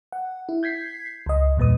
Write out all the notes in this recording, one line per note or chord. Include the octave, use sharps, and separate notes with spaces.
F#5
E4
G6 G#6 B6 C7
C#2 D#5
E2 G2 A#2 B4 D#6